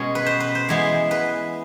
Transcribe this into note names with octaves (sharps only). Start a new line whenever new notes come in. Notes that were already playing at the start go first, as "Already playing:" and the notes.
Already playing: B2 G#3 C#4
B4
C5
B4
C5
E3 G#3 B3
B4